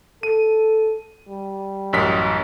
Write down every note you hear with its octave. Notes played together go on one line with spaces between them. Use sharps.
A4 D#7
G3
A1 F#2 B6